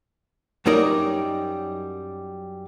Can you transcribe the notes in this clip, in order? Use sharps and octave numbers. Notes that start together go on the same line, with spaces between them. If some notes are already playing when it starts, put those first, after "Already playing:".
F#2 F#3 G3 D#4 A#4 D5